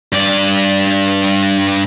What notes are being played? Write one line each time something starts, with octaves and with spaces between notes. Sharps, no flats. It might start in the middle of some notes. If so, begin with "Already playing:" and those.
G2 D5